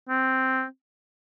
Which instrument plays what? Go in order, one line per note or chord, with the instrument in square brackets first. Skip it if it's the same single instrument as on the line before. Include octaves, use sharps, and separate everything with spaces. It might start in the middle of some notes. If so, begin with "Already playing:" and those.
[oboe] C4